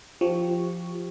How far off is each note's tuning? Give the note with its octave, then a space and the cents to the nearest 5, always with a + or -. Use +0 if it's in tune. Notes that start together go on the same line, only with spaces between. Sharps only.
F3 +0 G4 +0 C#6 +0